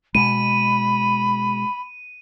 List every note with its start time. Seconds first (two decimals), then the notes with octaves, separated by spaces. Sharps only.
0.15 B2 G#3 B5 D#7